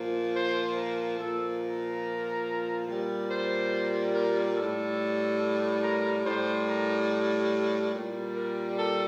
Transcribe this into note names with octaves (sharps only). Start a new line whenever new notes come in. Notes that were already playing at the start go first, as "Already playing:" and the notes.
Already playing: A#2 F3
C5
A#4
A#2 F3 A4
A#4
A#2 G3
C5
A#4
A2 G3 A4
A#4
A2 G3 C5
A#4
A#2 G3
A#4
A4